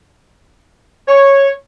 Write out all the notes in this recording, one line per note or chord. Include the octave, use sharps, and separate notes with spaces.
C#5